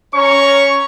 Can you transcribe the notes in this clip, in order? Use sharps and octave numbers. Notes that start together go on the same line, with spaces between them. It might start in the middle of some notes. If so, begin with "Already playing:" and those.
C#4 C#5 A#5 C#6